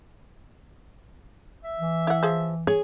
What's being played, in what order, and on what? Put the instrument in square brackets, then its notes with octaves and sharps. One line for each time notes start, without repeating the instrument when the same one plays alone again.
[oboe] E5
[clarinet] E3
[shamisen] E4 F#5
F3 G#4
[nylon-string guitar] G#4 [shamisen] C#5